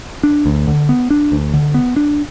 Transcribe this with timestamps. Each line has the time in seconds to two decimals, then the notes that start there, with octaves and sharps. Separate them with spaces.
0.23 D4
0.46 D2
0.67 D3
0.89 B3
1.10 D4
1.32 D2
1.54 D3
1.74 B3
1.96 D4